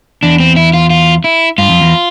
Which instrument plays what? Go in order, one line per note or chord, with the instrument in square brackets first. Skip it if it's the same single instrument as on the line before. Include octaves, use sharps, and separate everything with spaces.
[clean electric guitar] E2 [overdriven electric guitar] D4
[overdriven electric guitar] C4
E4
F4
F4
E4
[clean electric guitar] G2 [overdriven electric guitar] F4
[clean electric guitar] F2
E2